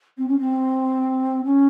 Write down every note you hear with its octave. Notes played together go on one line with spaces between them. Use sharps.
C4
C#4
C4
C#4